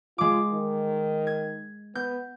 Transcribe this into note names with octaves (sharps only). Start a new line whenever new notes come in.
G#3 F4 D6
D#3
G#6
B3 G6